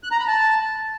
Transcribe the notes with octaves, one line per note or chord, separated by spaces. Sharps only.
F#6
A#5
B5
A5